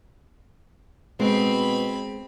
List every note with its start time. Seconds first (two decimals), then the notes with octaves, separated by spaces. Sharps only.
1.19 B2 G#3 C4 B5